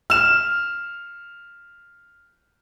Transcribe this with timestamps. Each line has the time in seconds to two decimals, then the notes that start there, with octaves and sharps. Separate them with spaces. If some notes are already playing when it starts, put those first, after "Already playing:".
0.10 F6 E7